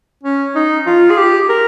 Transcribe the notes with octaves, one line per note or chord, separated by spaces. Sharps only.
C#4
D#4
F4
G#4
G4
A#4